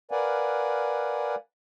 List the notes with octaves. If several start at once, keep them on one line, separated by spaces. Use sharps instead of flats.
A#4 B4 D5 F5 F#5 G#5